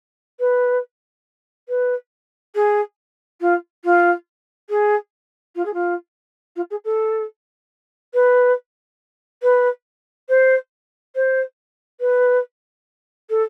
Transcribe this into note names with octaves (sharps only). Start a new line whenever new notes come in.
B4
B4
G#4
F4
F4
G#4
F4
G#4
F4
F4
G#4
A4
B4
B4
C5
C5
B4
A4